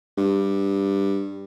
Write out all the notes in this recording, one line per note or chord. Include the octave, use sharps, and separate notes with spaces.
G2